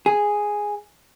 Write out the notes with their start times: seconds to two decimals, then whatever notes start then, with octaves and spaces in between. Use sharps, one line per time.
0.06 G#4